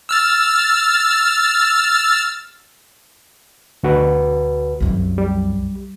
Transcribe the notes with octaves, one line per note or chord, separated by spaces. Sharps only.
E6 F6 A6
D2 F#4 B4
C2 F#2
G3